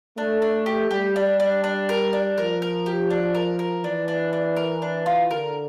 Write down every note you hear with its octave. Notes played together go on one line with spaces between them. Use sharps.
A3 D4
D4
G4
G3 G4
D4
D4
D4
A#4
D4
F3 A#4
A#4
G4
D4
A#4
A#4
E3 D4
D4
D4
A#4
D4
F4
D3 A#4